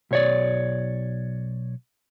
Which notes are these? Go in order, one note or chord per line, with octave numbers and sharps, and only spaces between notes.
B1 C#5 D5